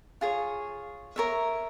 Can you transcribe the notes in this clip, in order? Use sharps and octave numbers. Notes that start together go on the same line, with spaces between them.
F4 G#4 C#5
A#4 C#5 E5